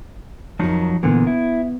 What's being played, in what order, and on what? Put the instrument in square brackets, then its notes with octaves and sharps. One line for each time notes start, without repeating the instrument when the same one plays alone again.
[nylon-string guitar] F2 D#3 [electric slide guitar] F3 F#3 D#4
[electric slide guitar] A#2 D3 E3 [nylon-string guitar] B3
[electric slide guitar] E4